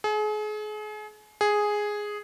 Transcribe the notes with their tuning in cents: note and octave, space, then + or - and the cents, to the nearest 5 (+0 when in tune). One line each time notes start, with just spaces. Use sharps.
G#4 +35
G#4 +0